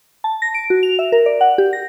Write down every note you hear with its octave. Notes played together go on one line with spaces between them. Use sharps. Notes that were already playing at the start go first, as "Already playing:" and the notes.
A5
A#6
D7
F#4
F7
E5
A#4
D5
F#5
G4
A#6